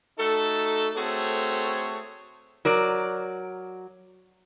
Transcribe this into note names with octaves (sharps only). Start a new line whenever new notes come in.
A3 D#4 F#4 A4
A3 C4 F#4 G#4 A4 C#5
F#3 A#4 D5